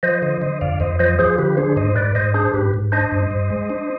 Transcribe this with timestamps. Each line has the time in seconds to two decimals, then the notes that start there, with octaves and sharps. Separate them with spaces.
0.03 F3 C5 D#5
0.22 D3 C5 D#5
0.41 D3 C5 D#5
0.61 F2 D5 F5
0.80 F2 C5 D#5
0.99 F3 C5 D#5
1.19 F3 G#4 C5
1.38 D3 G4 B4
1.57 D4 G#4 C5
1.76 G#2 C5 D#5
1.96 G#2 B4 D5
2.15 G#2 C5 D#5
2.34 D4 G#4 C5
2.53 G#2 G4 B4
2.74 G#2
2.92 D4 C5 D#5
3.12 G2
3.31 G2
3.50 G#3
3.70 D4